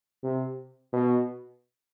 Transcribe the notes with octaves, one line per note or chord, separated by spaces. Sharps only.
C3
B2